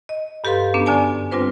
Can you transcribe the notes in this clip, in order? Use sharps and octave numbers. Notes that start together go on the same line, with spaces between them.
D#5
G2 G4 A4 B4 F5 C6
F#2 B3 C#4 D4
F#2 D3 D4 D5 G#5 A5
G3 C4 D4 F4 B4 C5